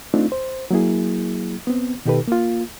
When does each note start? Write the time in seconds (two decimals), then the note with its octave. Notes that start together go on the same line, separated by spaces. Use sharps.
0.14 A3 C4 D4 D#4 F4
0.32 C5
0.71 F#3 A#3 E4 G#4
1.67 B3 C4
2.06 B2 D#3 D#4 G4 A4 B4
2.27 A#3 F4